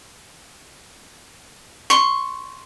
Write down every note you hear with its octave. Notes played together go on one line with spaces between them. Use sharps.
C6 C#6